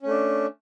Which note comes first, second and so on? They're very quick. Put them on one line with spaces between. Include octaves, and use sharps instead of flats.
C#4 A3 D4